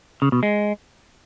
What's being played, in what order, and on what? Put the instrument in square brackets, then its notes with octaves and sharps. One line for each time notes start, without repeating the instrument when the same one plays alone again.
[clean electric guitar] C#3
B2
G#3